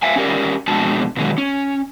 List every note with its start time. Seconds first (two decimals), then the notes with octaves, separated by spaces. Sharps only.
0.03 E5 F5 G#5
0.16 C#4 G4 A#4 D5
0.68 F2 B2 G#3 D4 F#4 A5
1.17 B2 D3 D#3 F#3 G#3
1.38 C#4